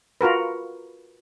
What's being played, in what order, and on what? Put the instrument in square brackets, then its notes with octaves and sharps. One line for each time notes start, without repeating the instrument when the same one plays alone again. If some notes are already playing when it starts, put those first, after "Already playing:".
[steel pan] F4 F#4 A#4 B4